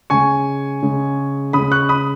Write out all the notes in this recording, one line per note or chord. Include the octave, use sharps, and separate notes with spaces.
C#3 G#3 G#5 C#6
C#3 G#3
C#3 G#3 B5 D#6
C#6 F#6
B5 D#6